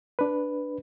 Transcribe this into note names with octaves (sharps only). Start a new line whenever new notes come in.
D4 B4